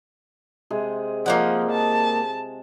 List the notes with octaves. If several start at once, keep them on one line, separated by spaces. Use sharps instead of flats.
C3 G#3 G#4
F3 A#3 D#4 F#5
A5